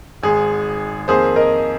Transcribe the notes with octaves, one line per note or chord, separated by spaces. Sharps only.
G#1 G#2 G#3 G#4
F2 D#3 A#3 G#4 C5
A#4 D#5